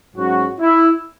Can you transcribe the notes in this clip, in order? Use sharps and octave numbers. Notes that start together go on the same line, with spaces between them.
G#2 F#3 C#4 F#4
E4